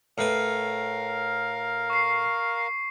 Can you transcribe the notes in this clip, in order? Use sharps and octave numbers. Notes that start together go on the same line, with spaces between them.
A2 A#4 B4 F5
C#6 C7